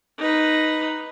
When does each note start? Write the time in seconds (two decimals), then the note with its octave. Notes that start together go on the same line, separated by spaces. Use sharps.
0.18 D#4 B4